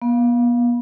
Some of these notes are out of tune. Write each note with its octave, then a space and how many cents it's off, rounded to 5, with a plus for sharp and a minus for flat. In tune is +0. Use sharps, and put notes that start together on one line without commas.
B3 -35 F5 +0